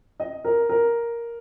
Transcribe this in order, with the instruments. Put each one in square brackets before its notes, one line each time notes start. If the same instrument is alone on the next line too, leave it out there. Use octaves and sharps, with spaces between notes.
[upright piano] D#5
A#4
A#4